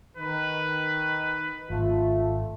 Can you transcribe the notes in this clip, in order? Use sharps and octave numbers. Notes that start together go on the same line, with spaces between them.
D#3 B4
G#1 A3 F4